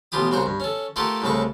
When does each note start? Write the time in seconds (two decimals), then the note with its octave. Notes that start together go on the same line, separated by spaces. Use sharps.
0.12 A1 B2 F4 G4 D#6
0.31 C2 C#3 F#4 C5 A#5
0.46 G2
0.60 C#4 A4
0.96 A3 F4 G4 A4 A#4 F#5
1.22 C2 A2 C#3 A3 A4 C#6